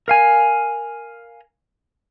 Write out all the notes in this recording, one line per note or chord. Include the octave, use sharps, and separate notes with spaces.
A#4 F5 G#5